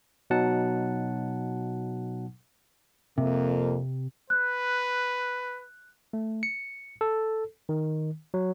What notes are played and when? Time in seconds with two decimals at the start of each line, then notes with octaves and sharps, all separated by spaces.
0.30 B2 F#3 D#4 F#5 A5
3.18 F2 C3 A#3
4.30 B4 F#6
6.13 A3
6.43 C#7
7.01 A4
7.69 D#3
8.34 F#3